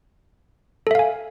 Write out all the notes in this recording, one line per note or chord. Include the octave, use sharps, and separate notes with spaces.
A4 E5 F5 G#5